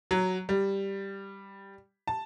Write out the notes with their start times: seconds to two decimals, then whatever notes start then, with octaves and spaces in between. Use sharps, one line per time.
0.11 F#3
0.49 G3
2.07 A5